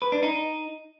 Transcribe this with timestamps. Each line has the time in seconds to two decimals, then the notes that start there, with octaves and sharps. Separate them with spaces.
0.02 B4
0.12 D4
0.23 D#4